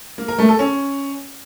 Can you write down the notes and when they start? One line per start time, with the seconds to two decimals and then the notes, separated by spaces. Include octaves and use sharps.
0.18 A#3
0.28 A#4
0.39 A3
0.49 A4
0.59 C#4